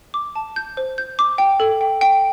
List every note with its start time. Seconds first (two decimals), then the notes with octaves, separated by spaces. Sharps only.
0.14 D6
0.36 A5
0.56 G6
0.77 C5
0.98 G6
1.19 D6
1.38 G5
1.60 A4
1.81 G5
2.01 G5